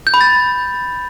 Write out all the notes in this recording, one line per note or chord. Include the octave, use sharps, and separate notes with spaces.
G6
B5
A6